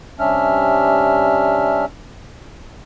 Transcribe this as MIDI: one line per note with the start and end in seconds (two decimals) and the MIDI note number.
0.20 1.85 48
0.20 1.85 55
0.20 1.85 61
0.20 1.85 62
0.20 1.85 76
0.20 1.85 89